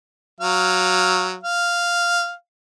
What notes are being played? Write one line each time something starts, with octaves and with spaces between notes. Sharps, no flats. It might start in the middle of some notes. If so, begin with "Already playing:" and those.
F#3 F5
F5